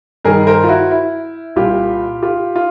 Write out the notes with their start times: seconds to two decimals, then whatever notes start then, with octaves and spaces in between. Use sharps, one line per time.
0.25 G2 D#3 G#4 A#4
0.47 A#4 C5
0.64 F4
0.68 E4 F#4
0.91 E4
1.56 C2 A#2 F4 G4
2.22 F4 G4
2.56 F4